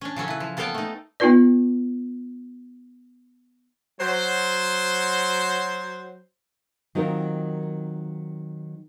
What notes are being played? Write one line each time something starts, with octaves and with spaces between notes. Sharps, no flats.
C#4 D4
C#3 F#3 C#4 A4
E4 B4
F3
A#3 B3 A4 F5 G5 A5
A3 D#4
B3 D#4 F4 B4 D5
F#3 C5
D#3 F#3 C4 D#4 F4 A#4